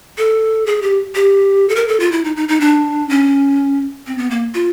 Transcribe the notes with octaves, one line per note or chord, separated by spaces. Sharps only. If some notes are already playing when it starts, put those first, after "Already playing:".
A4
G#4
G4
G4
A4
A#4
A4
F4
E4
D#4
D#4
D#4
D4
C#4
C4
B3
A#3
F4